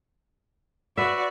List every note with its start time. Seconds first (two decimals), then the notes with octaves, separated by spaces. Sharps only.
0.97 F#4 B4 D5 E5